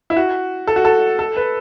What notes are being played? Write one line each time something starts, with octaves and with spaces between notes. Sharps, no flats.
E4
F#4
A4
F#4
A4
A4
B4